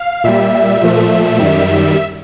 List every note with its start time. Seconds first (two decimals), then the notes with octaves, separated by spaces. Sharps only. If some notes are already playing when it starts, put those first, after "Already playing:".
Already playing: F5
0.24 A#2 G3 E5
0.81 A#2 F3 A3
1.39 F#2 D#3 G3